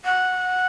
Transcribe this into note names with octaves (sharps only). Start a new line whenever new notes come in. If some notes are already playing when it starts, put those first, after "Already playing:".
F#5